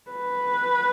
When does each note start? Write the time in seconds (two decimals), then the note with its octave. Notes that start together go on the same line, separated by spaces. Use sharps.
0.11 B4